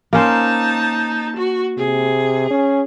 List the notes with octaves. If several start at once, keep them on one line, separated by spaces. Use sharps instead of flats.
A#3 C#4 D#4 C5 A5
F#4
C3 G#4
C#4